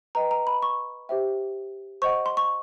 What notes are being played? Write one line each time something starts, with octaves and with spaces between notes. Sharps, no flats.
B4 D#5 G5 A#5
A#5
B5
C#6
G4 C5 E5 G5
C5 D#5 F#5 C#6
C6
C#6